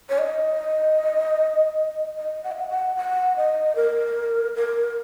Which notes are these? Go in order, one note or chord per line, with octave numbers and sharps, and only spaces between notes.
C#5
D#5
D#5
F#5
D#5
F#5
F#5
F#5
D#5
A#4
A#4